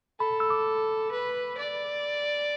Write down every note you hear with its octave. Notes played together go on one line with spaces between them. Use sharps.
A4 B5
E6
D6
B4
D5